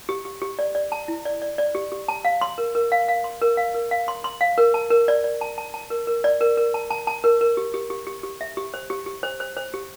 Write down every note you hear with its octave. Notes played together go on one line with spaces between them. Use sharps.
G4
G4
G4
D5
D5
A5
E4
D5
D5
D5
G4
G4
A5
F5
C6
A#4
A#4
F5
F5
C6
A#4
F5
A#4
F5
C6
C6
F5
A#4
A5
A#4
D5
D5
A5
A5
A5
A#4
A#4
D5
A#4
A#4
A5
A5
A5
A#4
A#4
G4
G4
G4
G4
G4
E5
G4
C5
G4
G4
C5
C5
C5
G4